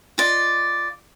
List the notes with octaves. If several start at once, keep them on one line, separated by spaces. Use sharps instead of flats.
F4 D5 D#5